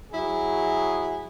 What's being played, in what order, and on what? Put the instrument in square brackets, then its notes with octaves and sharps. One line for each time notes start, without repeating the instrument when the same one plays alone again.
[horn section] F#3 E4 G#4